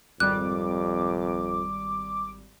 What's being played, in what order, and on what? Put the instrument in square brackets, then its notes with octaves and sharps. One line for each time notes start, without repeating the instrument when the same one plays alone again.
[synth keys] G#1 G3 [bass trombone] F2 [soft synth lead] D6 [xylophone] F#6